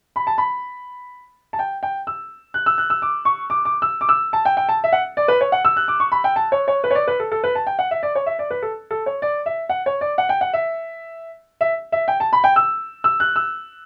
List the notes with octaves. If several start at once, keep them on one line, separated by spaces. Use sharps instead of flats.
B5
A5
B5
A5
G5
G5
E6
F#6
E6
F#6
E6
D6
C#6
D6
D6
E6
D6
E6
A5
G5
G5
A5
E5
F#5
D5
B4
C#5
F#5
E6
F#6
D6
C#6
B5
G5
A5
C#5
C#5
B4
C#5
D5
B4
A4
A4
B4
A5
G5
F#5
E5
D5
C#5
E5
D5
B4
A4
A4
C#5
D5
E5
F#5
C#5
D5
F#5
G5
F#5
E5
E5
E5
G5
A5
B5
G5
E6
E6
F#6
E6